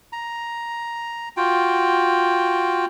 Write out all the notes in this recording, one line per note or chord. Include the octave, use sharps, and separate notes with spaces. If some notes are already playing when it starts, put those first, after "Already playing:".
A#5
F4 F#4 G5